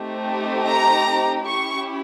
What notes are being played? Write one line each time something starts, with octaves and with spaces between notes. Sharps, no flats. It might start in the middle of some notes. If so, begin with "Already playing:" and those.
Already playing: A3 C4 D#4 G4
A#5
C#4 E4 G4 C#6